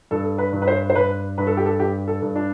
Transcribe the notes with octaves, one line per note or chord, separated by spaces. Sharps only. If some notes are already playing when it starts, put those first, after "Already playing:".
G2 A4
B4
G2
B4
C5
C5
G2 B4
G2 B4
A4
G4
A4
G2 G4
A4
G2
D4